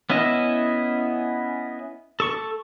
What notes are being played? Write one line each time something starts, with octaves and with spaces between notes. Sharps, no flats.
B3 C#4 E4 D#5 E5
A4 C#6